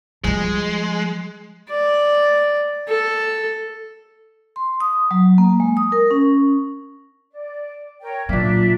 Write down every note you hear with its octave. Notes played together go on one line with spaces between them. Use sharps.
F3 G3 G#3
D5
A4
C6
D#6
F#3
A#3
G#3
D#6
A#4
C#4
D5
A#4 C#5 G5
A#2 C#3 F#3 A#3 D4 E5